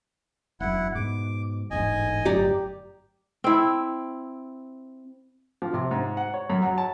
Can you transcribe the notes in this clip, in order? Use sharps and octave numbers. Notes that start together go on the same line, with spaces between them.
E1 F#2 E4 F#5
G#2 B2 D6
E1 A1 G#2 D#5 G#5
G1 F#2 A2 G4 D5 A#5
C4 E4
F3
C3
G#2
F#5
C#5
F#2
F#3
A5